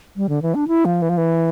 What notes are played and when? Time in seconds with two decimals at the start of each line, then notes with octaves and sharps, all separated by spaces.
0.16 G3
0.29 D3
0.42 E3
0.55 D4
0.68 E4
0.85 F3
1.02 E3
1.09 F3
1.18 E3